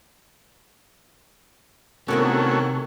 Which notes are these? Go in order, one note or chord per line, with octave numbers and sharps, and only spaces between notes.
C3 D#3 A3 B3 C#4 E4 F#4 A#4